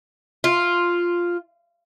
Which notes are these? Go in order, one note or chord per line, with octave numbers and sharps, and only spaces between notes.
F4